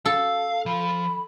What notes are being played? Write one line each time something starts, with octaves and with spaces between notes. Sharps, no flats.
A4 F5
F3 F5 B5